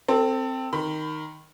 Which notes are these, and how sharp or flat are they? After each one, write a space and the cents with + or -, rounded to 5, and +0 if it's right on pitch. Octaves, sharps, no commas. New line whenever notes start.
C4 +0 A4 +25
D#3 +0 B5 +25